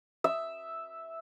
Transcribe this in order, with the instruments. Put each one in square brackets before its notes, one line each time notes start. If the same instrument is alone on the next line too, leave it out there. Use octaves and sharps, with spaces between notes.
[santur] E5